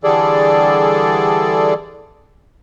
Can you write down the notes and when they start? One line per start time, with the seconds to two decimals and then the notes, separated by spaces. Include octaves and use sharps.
0.04 D3 E3 G3 G#4 A4 D5